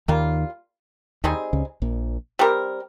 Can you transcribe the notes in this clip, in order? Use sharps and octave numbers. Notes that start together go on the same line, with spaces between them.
D#2 D#3 G3 A#3 F4
D#2 D#3 G3 C4 D#4 G#4
C#2 C#3
A#1 A#2
G3 C4 G4 A#4